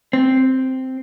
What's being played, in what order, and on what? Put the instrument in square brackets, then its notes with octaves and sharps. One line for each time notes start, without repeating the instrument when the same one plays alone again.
[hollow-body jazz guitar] C4